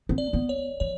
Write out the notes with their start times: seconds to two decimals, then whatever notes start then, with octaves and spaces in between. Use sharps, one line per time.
0.09 C4
0.18 D5
0.33 B3
0.49 C#5
0.80 F3 C#5